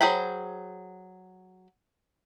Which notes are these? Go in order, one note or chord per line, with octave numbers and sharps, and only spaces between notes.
F#3 G#4 C5 G5 B5